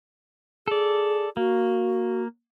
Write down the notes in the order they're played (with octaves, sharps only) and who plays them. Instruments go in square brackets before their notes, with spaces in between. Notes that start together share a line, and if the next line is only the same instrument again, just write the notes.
[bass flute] G#4 [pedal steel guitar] A4 D5
[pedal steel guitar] A#3 [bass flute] F#4